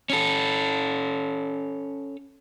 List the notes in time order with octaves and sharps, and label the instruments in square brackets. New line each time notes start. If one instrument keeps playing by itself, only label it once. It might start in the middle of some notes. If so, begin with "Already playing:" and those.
[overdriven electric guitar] C#4 A4